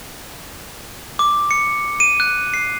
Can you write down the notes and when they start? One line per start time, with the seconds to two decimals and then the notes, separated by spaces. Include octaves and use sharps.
1.19 D6
1.51 C#7
2.00 D#7
2.20 F#6
2.54 C7